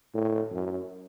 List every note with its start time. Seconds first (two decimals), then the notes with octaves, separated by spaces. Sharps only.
0.14 A2
0.52 F#2